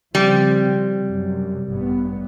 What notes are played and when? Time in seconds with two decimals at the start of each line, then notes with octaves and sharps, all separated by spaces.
0.15 C#3 F3 G3 C4
1.01 F#2 C3
1.70 A1 G2 B3